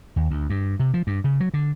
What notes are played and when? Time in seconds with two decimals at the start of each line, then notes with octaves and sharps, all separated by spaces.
0.16 D#2
0.31 D2
0.50 G2
0.80 C3
0.94 F3
1.07 G2
1.24 C#3
1.40 F#3
1.54 D3